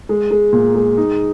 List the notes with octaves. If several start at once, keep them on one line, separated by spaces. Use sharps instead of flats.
G#3
G#3
A#2
G#3
D#4